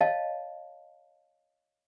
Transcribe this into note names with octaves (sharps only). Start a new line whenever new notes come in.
C#5 D#5 F5 A5